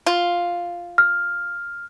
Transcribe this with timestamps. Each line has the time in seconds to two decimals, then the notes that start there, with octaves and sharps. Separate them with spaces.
0.06 F4
0.98 F6